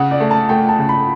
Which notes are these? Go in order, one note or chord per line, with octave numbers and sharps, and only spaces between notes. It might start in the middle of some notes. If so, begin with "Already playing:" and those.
Already playing: C#3 F#5
D5
A3
A5
A3 G5
A5
C#3
B5